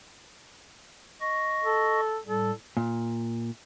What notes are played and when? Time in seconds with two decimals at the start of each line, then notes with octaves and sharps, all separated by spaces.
1.20 D#5 C#6 A#6
1.64 A4
2.27 A2 G3 A4
2.77 A#2